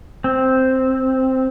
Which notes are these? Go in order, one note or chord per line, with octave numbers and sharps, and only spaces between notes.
C4